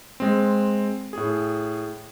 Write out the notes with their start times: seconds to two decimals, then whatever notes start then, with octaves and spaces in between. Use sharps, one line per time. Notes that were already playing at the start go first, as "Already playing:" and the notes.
0.20 G#3 C4
1.13 A2 G#4